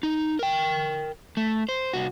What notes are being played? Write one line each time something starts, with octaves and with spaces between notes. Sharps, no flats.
D#4
A#4 G5
A3
C5
C2 F#4